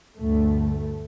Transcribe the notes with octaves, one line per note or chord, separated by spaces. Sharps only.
D2 G2 A3